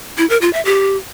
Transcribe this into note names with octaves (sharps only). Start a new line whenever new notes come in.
E4
A#4
F4
E5
G4